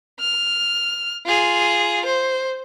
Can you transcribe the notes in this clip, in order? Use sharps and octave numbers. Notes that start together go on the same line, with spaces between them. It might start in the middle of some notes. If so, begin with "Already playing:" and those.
F6
F4 G#4
C5